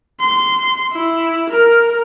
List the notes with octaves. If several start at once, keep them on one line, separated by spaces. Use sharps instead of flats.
C6
E4
A#4